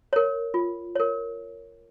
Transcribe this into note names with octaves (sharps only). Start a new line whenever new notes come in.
A#4 C#5
F4
A#4 C#5